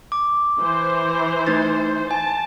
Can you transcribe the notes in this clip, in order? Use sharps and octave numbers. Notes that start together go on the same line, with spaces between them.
D6
E3 C5
A3 D#4 A6
G#5 A5